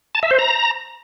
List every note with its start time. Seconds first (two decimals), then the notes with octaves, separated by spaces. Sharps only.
0.15 A5
0.23 E5
0.31 C5
0.39 A#5